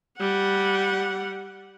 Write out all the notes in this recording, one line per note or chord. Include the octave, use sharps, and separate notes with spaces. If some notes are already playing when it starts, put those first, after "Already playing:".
G3 F#5